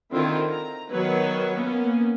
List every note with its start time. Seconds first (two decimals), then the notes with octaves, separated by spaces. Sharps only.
0.11 D3 D#3 C4 E4 F4
0.50 A#5
0.91 D#3 F#3 B3 B4 C#5
1.56 A#3 B3 C#4